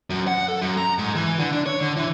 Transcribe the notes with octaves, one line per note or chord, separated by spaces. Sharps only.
F#2
F#5
A4
F#2
A#5
G#2
E3
D3
D4
C#5
D3
E3